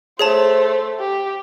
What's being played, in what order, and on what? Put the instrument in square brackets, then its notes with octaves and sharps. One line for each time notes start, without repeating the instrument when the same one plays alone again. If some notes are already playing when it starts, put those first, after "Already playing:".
[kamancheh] A3 C5 [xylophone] G#4 C#5 A5
[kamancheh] G4